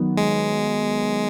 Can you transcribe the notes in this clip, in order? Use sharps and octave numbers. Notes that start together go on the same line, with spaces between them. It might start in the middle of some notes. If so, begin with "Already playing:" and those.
Already playing: D#3 F#3 B3
G#3